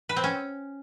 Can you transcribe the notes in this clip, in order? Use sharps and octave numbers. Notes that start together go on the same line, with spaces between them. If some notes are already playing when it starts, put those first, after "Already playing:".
B4
C4
C#4